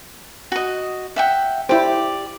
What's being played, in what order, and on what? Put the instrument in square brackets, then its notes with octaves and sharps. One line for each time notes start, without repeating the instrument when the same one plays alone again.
[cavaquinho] F#4 D#5
E5 F#5 G5
[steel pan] E4 C5 [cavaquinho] G4 D5